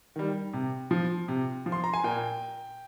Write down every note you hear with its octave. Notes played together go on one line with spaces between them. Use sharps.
D#3 G3
C3
F3
C3
F3
C6
A#5
G#5
A#2 G5